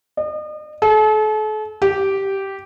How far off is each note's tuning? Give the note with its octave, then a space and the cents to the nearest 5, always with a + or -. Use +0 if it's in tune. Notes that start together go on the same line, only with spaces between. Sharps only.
D#5 -40
A4 -40
G4 -10